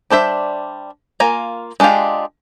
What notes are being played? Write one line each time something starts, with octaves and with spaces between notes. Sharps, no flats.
G3 D4 C5 E5
A#3 F4 G#5 A#5
G#3 D4 F4 G4 F5